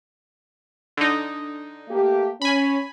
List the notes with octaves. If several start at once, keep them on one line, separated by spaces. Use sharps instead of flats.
D3 D#4
A3 A#3 G4
C#4 G#5 B5